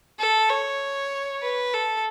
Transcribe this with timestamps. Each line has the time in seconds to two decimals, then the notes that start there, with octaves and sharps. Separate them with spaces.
0.19 A4
0.49 C#5
1.42 B4
1.74 A4